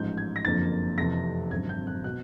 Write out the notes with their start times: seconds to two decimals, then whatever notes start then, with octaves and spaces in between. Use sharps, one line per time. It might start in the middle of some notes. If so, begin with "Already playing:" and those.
Already playing: A1 G#2 F3 G6
0.18 G#6
0.36 A#6
0.44 F#1 F2 D3 F3 A#3 A6
0.97 F1 F2 C3 E3 A#6
1.51 G#1 F#2 D3 G#6
1.69 G6
1.87 F#6
2.04 B2 F#6